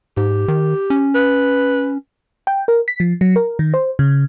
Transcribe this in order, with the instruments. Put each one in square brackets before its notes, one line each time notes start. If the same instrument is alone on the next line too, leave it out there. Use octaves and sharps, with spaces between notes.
[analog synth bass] G#2 [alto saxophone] G4
[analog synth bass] D#3
C#4
[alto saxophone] B4
[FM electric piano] G5
A#4
B6
F3
F#3
A#4
D#3
C5
C#3